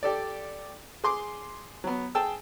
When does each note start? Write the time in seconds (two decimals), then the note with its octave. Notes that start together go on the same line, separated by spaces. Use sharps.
0.03 G4 A4 D5
1.04 G#4 C6 D6
1.84 F#3 B3
2.15 G#4 G5 A5 E6